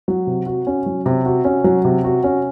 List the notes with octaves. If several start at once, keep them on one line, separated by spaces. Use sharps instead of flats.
F#3
C3
F#4
C#4
F#3
C3
F#4
C#4
F#3
C3
F#4
C#4